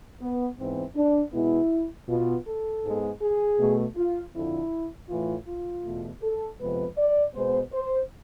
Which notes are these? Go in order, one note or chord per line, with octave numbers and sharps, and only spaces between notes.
B3
G#2 E3 B3 C4
D4
B2 G#3 B3 E4
B2 B3 F4
A4
G#2 G#3 B3
G#4
B2 A3
F4
F2 D3 F3 E4
A2 E3 A3 F4
F4
E2 B2 A3
A4
F2 C3 F3 G#3 B3 B4
D5
B2 G#3 B3 C5
C5